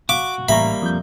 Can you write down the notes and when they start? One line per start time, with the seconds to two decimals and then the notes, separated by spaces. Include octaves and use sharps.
0.09 F#4 F5 D6
0.49 A1 G3 A#3 E5 A#5 B5 C#6
0.82 F2 G6